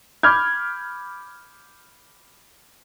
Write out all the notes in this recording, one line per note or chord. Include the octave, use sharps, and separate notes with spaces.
B5 D6 F6 G6 G#6